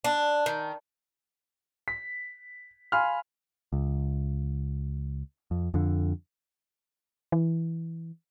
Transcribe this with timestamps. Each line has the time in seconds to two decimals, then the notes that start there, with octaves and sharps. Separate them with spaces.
0.04 D4
0.46 D#3
1.88 B6
2.92 F5 G#5 B5 C6 F6
3.73 C#2
5.51 F2
5.74 F2 D3
7.32 E3